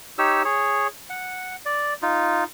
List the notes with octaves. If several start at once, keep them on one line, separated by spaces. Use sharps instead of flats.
D#4 G4 C#5 E6
G#4 C#5
F#5
D5
D#4 F4